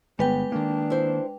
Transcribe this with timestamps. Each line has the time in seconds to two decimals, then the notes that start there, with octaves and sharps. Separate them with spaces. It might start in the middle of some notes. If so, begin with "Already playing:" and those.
0.19 G1 G#3 B3 B4 G5
0.52 D#3 A#3 D4
0.90 E4 C5